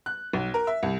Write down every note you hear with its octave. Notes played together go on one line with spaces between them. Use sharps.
F#6
B1
A#4
E5
C2